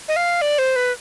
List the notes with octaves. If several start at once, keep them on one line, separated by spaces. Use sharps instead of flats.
D#5
F5
D5
C5
B4